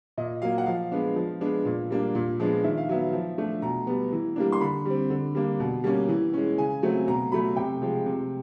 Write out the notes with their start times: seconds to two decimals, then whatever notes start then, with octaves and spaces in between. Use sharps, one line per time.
0.18 A#2 D#5
0.42 F#3 A#3 F5
0.58 F#5
0.66 F3 F5
0.92 G#3 B3 D4
1.16 F3
1.41 G#3 B3 D4
1.65 A#2
1.90 G3 A#3 D4
2.15 A#2
2.40 F3 G#3 B3 D4
2.64 D#3 E5
2.78 F5
2.89 F#3 B3 E5
3.13 F3
3.38 A3 D4
3.62 B2 A#5
3.87 G3 B3
4.12 E3
4.36 G3 A#3 D4
4.52 C6
4.61 D3 B5
4.86 G3 C4
5.10 D3
5.35 G3 A#3 D4
5.60 B2
5.84 G3 A#3 C#4
6.09 E3
6.34 G#3 C#4
6.58 C#3 G#5
6.83 F#3 A3 C4
7.08 B2 A#5
7.32 F#3 A3 B5
7.57 C3 G5
7.82 F3 G#3
8.06 C3